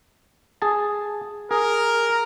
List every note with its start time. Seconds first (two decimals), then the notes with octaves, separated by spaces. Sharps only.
0.62 G#4 A5
1.51 G#4 A#4